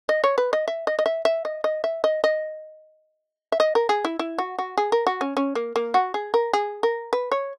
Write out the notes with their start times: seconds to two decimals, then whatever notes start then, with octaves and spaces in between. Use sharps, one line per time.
0.09 D#5
0.24 C#5
0.38 B4
0.53 D#5
0.68 E5
0.87 D#5
0.99 D#5
1.06 E5
1.25 E5
1.45 D#5
1.64 D#5
1.84 E5
2.04 D#5
2.24 D#5
3.52 E5
3.60 D#5
3.75 A#4
3.89 G#4
4.05 E4
4.19 E4
4.38 F#4
4.59 F#4
4.78 G#4
4.92 A#4
5.07 F#4
5.21 C#4
5.37 C#4
5.55 A#3
5.76 A#3
5.94 F#4
6.14 G#4
6.34 A#4
6.53 G#4
6.83 A#4
7.13 B4
7.32 C#5